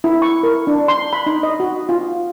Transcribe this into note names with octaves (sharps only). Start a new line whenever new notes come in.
E4
C#6
A#4
D4
C6
B5
D#4
D#5
F#4
F4